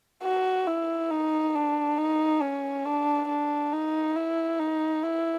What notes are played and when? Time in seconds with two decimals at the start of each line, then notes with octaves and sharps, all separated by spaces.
0.23 F#4
0.67 E4
1.11 D#4
1.55 D4
1.98 D#4
2.42 C#4
2.85 D4
3.29 D4
3.73 D#4
4.16 E4
4.60 D#4
5.03 E4